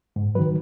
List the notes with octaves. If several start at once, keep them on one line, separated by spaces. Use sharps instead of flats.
G#2
D#3 F#3 B4